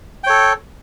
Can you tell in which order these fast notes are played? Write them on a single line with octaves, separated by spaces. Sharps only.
G5 C#5 A4